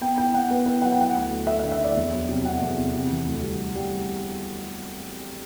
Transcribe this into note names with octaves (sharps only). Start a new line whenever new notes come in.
B3 G5
E4 G5
B3 F#5
B3 B4
E4 B4
F#3 F#5
G5
E4 F#5
D2
D2
A3 E5
E5
D3
E5
E4
D5
E2
F#3
C3
C3 F#5
E2
C3
C3
E3
D2
G3
D2
G3